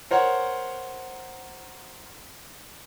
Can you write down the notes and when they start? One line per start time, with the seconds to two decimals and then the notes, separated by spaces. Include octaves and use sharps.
0.11 A#4 C5 C#5 F#5